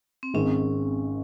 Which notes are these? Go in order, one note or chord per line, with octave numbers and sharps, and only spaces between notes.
C4
G#1 G#2 D#3 G#3 C#4